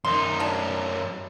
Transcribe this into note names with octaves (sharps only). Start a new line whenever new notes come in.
F#2 D#4 C6
D#3 D4